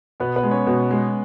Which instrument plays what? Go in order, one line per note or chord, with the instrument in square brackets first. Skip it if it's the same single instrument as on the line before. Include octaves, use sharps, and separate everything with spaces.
[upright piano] B2 [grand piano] B3 B4
[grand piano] B3 B4
[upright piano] G#3
[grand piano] C#4 C#5
[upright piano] B2
G#3